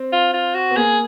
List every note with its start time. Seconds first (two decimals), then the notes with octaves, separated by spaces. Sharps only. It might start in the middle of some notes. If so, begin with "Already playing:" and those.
Already playing: C4
0.13 F4
0.34 F4
0.55 F#4
0.71 B3
0.76 A#3 G#4